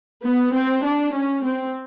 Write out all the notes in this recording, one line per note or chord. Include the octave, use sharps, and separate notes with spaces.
B3
C4
D4
C#4
C4